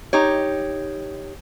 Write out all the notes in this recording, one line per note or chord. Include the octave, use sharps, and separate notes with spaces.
D#4 G4 C#5